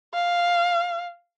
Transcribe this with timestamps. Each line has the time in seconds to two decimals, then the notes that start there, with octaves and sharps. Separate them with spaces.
0.14 F5